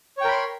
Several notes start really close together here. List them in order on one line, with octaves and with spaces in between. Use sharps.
C#5 G5 A#4 B5 C6